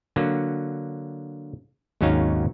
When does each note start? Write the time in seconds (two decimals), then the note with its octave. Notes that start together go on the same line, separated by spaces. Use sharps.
0.16 D3 F#3 A#3
2.01 G#1 D#2 F#3 C#4 D#4 F5